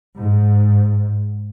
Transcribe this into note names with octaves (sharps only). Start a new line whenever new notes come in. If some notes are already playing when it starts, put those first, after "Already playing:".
G#2